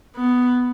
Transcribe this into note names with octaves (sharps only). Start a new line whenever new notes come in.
B3